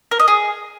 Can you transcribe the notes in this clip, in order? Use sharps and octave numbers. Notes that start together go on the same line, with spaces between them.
A#4
D#5
G#4